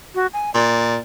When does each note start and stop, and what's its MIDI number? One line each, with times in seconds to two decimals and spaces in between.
0.15 0.27 66
0.33 0.53 80
0.54 0.97 46
0.54 0.97 74